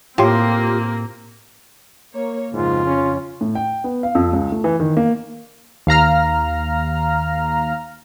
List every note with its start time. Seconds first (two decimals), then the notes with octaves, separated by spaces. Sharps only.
0.18 A2 A#3 C4 F4 G4 C6
2.14 A#3 C#5
2.53 F2 G#2 C#3 F4
2.86 C#4
3.41 A2
3.55 G5
3.84 B3
4.03 F5
4.15 F2
4.33 C#2
4.52 A3
4.64 E3
4.80 D#3
4.97 A#3
5.87 D#2 F5 A#5 F6